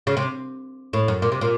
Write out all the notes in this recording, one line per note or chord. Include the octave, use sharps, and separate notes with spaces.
C#3
C3
A2
F#2
A#2
C3
A#2